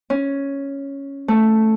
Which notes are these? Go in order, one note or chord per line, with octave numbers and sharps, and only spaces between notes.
C#4
A3